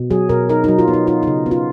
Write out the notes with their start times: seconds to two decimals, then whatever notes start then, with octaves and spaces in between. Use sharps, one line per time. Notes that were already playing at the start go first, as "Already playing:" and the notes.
Already playing: B2
0.10 F#3 G#4
0.29 B2 A#4
0.49 D#4 A#4
0.64 F#3 D#4
0.79 F4
0.88 B3
0.93 D#4
1.07 D#4 F4
1.23 C#3 D#4
1.46 B3
1.51 F4